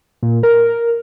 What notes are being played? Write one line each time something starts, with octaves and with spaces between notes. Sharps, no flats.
A#2
A#4